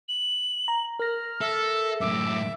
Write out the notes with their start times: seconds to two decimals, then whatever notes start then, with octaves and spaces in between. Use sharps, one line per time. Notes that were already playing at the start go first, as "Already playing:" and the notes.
0.09 F#7
0.68 A#5
0.99 A#4 F6 A#6
1.41 A4 E5
2.01 F#2 A2 E5 D6